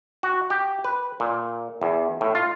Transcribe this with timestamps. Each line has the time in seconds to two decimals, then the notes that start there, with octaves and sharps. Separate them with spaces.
0.23 F#4
0.50 G4
0.84 B4
1.20 A#2
1.82 E2
2.21 A2
2.35 F4